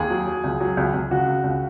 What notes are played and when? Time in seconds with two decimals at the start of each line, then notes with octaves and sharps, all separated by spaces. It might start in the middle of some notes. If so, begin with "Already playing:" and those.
Already playing: D#2 G#4
0.10 F#3
0.27 F#3
0.44 C#2
0.60 F#3
0.77 C#2
0.94 C#2
1.10 C#3 F#4
1.27 C#3
1.44 C#2